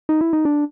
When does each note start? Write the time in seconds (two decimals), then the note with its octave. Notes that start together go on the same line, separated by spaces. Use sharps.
0.09 D#4
0.21 E4
0.33 D#4
0.45 D4